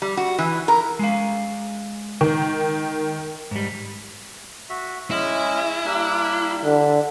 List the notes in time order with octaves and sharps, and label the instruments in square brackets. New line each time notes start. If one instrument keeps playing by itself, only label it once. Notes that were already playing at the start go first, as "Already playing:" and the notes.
[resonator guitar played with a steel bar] G3
F#4
E3
A#4
[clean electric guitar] G#3 F5
[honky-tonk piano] D#3
[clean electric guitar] G#2 G3
[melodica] F#4 E5
[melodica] G#3 C#4 D#5 [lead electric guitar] E4
[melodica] G3 A#3 D4
[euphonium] D3 [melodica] E5